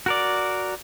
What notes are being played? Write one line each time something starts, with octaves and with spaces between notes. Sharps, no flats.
F#4 A#4 D5